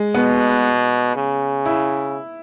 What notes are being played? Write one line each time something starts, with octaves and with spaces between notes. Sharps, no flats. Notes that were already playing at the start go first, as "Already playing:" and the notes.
Already playing: G#3
B2 B3
C#3
E4